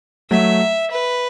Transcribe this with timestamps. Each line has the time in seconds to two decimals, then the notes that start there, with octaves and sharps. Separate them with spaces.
0.30 F#3 A3 E5
0.91 B4